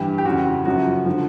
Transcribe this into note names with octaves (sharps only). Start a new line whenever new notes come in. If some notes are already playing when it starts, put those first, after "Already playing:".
Already playing: G2 E3 G4
G4
F2 C#3 E3 F#4
F#2 C#3 F3 F#4
D3 F3